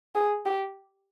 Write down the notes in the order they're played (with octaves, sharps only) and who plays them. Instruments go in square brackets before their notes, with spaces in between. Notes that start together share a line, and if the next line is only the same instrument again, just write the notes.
[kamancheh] G#4
G4